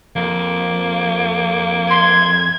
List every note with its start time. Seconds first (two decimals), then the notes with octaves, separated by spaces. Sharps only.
0.16 F2 A#3
1.90 C6 G#6